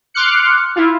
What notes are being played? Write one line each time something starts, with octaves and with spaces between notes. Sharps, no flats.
C6 D6 F6 F#6 C#7
E4 F4